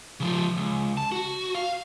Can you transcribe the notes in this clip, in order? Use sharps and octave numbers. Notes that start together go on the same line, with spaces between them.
C#3 F3
C#2
A5
F#4
F5